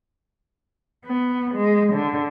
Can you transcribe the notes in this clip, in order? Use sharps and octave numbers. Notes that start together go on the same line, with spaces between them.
B3
G#3
D3